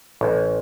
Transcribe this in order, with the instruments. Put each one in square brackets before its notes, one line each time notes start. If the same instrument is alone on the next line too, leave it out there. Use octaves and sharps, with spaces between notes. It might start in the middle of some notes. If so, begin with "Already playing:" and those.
[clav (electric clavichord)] A1